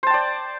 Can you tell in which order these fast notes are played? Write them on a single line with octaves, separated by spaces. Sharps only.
C5 A5 G5 D5